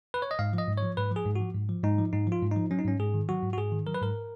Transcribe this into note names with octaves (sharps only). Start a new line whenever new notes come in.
B4
C#5
D#5
G#2 F5
F3
D#5
G#2
F3 C#5
G#2 B4
F3 G#4
G#2
F#4
F3
G#2
F3
G#2 D#4
F3
G#2 D#4
F3 F4
G#2
F3 D#4
F#3 C#4
D#4
G#2 C#4
G#2 G#4
D#3
F#3 F#4
G#2
F#4
G#2 G#4
D#3
F#3 A#4
B4
G#2 A#4